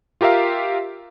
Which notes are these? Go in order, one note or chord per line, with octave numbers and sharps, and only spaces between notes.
F4 G4 A#4 E5 F5